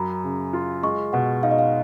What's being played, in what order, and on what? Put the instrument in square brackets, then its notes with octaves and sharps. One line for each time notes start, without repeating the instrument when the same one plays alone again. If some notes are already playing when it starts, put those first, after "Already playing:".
Already playing: [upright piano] F#2 F#3 [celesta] A#5 B5
[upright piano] C#3
F4
[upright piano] G#3 [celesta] C#6
[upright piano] B2 [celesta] F#5
[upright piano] D#4 [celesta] F5
[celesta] D#5
F5